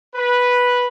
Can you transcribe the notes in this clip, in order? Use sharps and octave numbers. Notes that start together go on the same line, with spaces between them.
B4